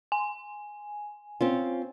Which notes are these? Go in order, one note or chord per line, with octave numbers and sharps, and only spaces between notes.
G#5
C4 C#4 F4